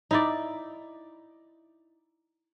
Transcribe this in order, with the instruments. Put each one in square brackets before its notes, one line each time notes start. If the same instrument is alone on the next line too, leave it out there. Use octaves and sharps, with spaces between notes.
[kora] D#4 E4 D5